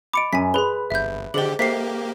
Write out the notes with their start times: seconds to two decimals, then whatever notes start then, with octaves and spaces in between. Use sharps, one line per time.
0.13 D#5 B5 D6 C#7 D7
0.33 F#2 G#5 B6
0.54 G#4 B4 B5 C6 G7
0.90 G1 E5 G6
1.34 D3 G4 G#4 C5 D#5 F#7 G7
1.59 A#3 G4 A4 C5 E5 B6 C7